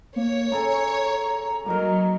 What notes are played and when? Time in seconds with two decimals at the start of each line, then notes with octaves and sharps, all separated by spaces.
0.16 A#3 C#5
0.52 C#3 A4 G#5 A#5
1.66 F#3 A#3 D#4 A#4